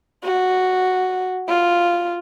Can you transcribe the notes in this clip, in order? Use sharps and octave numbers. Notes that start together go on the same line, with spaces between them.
F#4
F4